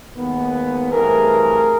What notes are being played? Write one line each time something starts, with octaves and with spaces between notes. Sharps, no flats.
D#2 D#3 G#3 B3
G2 E3 A3 C4 G#4 A#4